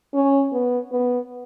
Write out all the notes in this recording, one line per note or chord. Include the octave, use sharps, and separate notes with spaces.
C#4
B3
B3